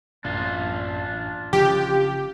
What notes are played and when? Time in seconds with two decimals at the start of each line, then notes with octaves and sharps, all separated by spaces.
0.25 A1 F#2 D4 F4
1.53 F#1 C#3 F3 G4